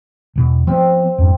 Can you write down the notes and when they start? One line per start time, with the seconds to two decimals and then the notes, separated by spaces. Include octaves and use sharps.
0.36 E1 B2
0.67 F3 F#3 B3 C4
1.18 F2 G#2